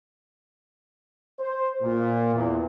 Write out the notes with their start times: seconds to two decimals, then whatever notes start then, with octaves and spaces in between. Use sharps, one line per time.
1.39 C5
1.82 A#2
2.35 E2